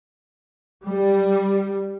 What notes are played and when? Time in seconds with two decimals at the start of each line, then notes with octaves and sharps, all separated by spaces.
0.83 G3